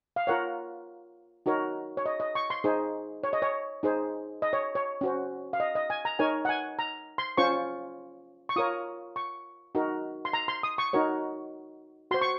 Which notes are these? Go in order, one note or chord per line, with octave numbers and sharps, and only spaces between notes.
F5
F4 A#4 C#5 F#5
D#4 F#4 A#4 C#5
C#5
D#5
D#5
C#6
C6
D#4 G#4 C5
C#5
D#5
C#5
D#4 G#4 C5
D#5
C#5
C#5
C#4 F#4 C5
F5
D#5
D#5
G#5
A#5
D#4 A#4 C#5 G#5
F#5
G#5
A#5
C6
C#4 F4 C5 C#6
C#6
F4 A#4 C#5 D#6
C#6
D#4 F#4 A#4
C6
A#5
C6
D#6
C#6
D#4 F#4 A#4 C#5
F#4 C5 C6
C#6